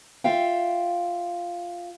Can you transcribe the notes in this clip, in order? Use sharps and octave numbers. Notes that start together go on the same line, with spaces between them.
F4 E5 F5 G5